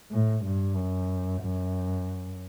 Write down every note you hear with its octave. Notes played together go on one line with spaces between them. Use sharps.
A2
G2
F#2
F#2